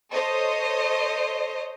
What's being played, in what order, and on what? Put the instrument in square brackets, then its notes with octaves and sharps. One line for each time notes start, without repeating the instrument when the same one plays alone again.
[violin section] A4 C5 C#5 D#5